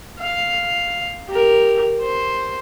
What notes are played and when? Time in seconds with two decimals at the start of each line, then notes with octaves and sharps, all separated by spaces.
0.19 F5
1.28 G4 A#4
2.01 C5